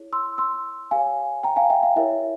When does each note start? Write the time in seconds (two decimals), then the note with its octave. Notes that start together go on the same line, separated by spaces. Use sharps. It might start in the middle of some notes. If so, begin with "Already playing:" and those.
Already playing: E4 G#4 C#5
0.13 C6 E6
0.38 C6 E6
0.91 G4 A#4 C#5 F5 G#5
1.43 G5 A#5
1.56 F5 G#5
1.70 E5 G5
1.83 F5
1.96 E4 G4 A#4 C#5 E5